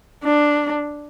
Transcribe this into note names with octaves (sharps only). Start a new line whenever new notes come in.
D4